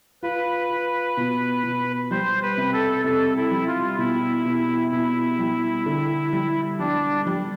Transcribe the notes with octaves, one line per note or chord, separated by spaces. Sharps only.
F4 B4
F4
B2
B2
G3 C5
B4
C3
A4
C3 A4
E4
G3
F4
B2 E4
B2
B2 E4
G3
D3
G3
G3 D4
G3